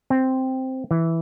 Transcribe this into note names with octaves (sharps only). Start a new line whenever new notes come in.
C4
E3